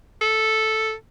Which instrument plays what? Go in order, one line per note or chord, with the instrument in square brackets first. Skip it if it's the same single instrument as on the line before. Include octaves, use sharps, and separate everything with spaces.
[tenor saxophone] A4